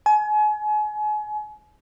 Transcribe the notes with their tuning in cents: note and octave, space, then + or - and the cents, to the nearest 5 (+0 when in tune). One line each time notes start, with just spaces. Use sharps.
G#5 +35